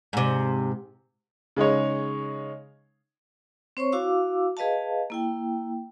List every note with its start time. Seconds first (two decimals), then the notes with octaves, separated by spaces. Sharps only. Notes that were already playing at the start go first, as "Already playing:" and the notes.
0.13 G#2 C3
1.57 C#3 G#3 D#4 C#5
3.77 C4 C5 C#5 C#6
3.92 E4 F#4 F5 D6 E6
4.57 G#4 B4 D#5 F5 A5
5.10 A#3 E4 G5